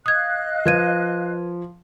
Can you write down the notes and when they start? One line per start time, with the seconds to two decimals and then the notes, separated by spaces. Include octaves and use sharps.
0.06 D#5 F5 D#6 F#6 G#6
0.65 F3 B4 G#6 D#7